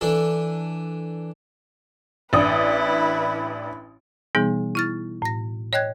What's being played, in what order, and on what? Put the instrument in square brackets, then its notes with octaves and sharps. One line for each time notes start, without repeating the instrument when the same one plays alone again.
[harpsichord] E3 D4 A4
[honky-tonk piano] A1 D4 D#6 [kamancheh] E4 B4
[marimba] B2 E3 G3 B3 D#4 G#4
E4 F6 A6
A2 A#6
C#5 D#5 G5 F#6 G#6